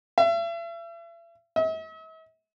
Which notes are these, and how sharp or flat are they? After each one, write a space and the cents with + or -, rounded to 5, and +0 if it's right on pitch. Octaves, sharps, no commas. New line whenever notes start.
E5 +40
E5 -45